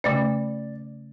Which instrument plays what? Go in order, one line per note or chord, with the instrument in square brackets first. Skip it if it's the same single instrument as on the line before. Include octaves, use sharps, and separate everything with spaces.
[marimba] C#3 A3 C#4 [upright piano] D5